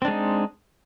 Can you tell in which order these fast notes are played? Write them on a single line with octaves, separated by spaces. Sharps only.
C4 D4 G#3 D#4